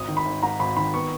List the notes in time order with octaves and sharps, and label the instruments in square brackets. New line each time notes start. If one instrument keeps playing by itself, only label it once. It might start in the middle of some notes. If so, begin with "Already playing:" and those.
Already playing: [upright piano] G#1 D#6
D#3
B5
G#1
G#2 A#5
G#1 B5
D#3 B5
B3 C#6